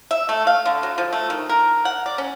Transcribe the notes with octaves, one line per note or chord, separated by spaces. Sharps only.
E5
A3
F5
D3
F#3
F3
A3
D#3
A#4
F#5
D5
C#4